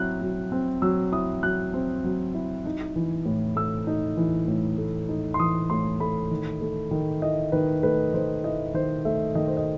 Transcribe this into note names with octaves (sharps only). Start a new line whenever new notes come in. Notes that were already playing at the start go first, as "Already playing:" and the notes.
Already playing: F#3 C4 E4 F#6
F#3
C4
F#3 E6
E4 D#6
F#3 F#6
C4
F#3
E4
D#4
E3
A2
A3 E6
D#4
E3
A2
A3
D#4
C6
E3 D#6
A2 C6
A3 B5
D#3
A3
D#3
E4 D#5
D#3 B4
A3 B4
D#3 C5
E4 D#5
D#3 C5
A3 E5
D#3 D#5
C5
D#5